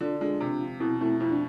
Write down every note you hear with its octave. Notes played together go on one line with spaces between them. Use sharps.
D3 D4 F4
G#3 D4 F4
C3
F3
B2 C4 E4
A3 C4 E4
F2 E4
D4